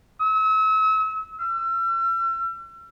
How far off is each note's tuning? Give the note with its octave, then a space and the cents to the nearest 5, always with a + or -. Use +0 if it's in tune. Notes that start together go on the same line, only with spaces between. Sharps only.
E6 -40
E6 +40